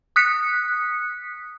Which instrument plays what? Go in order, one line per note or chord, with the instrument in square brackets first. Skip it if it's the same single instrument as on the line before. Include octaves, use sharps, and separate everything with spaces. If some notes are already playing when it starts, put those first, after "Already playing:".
[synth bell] D#6 F#6 B6 C#7